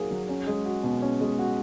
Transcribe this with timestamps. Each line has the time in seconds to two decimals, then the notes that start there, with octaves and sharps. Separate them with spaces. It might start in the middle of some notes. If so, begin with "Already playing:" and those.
Already playing: F#3 A#3 D#4 G#4
0.11 F#3
0.29 C#4
0.47 G#3
0.66 F#4
0.83 B2
1.02 C#4
1.21 G#3
1.39 F#4